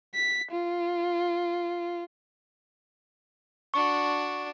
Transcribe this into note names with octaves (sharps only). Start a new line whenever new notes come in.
B6
F4
D4 F#4 C#6